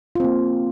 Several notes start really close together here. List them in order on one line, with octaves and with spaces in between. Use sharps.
F4 C4 A#3